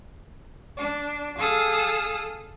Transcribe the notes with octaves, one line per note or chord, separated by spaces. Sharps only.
D4
G#4 A4 F5 D#6 E6